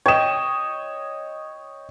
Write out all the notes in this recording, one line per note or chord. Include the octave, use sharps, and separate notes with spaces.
C#5 D#5 G5 E7